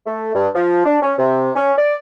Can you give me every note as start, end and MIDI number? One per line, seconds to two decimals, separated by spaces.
0.06 0.31 57
0.34 0.47 43
0.55 0.83 53
0.85 0.97 62
1.02 1.13 61
1.18 1.50 48
1.56 1.73 61
1.77 1.96 74